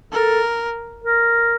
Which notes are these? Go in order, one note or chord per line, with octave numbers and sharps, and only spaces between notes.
A4 A#4
A#4